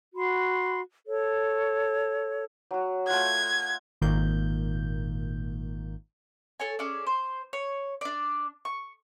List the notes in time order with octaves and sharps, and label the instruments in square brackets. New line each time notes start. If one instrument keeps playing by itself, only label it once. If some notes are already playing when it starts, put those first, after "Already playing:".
[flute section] F#4 B5 C6
A4 C#5
[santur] F#3 F#4
[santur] A3 F4 F#5 [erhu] G#6
[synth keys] G#1 A#2 D#3 A#3 G6
[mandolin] A4 C#5 G#5
C#4 G#4 A4 D5
C5
C#5
D4 D5
C#6